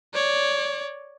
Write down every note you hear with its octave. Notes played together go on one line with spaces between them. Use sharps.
C#5 D5